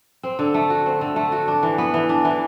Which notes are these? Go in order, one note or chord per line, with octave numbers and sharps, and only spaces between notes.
C4
D3
A3
F#4
C4
D3
A3
F#4
D4
E3
B3
E3
D4
E3